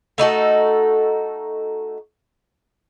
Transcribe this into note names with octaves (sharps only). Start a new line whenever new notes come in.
A3 D#4 F#4 A4